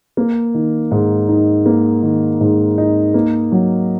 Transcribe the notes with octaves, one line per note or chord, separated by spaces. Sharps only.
A#3
D#3
G#2
D#4
A#3
D#3
G#2
D#4
A#3
F#3